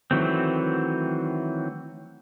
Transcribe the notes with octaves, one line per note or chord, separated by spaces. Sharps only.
D#3 E3 F#3 A3 C4